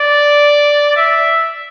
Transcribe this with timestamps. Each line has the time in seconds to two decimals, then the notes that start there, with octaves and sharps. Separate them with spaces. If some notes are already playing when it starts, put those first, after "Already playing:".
Already playing: D5
0.96 E5